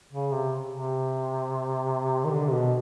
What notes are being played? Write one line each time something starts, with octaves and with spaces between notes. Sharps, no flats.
C#3
C3
C3
D#3
D3
B2